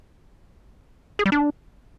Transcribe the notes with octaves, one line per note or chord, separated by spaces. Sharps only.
G#4
G3
D4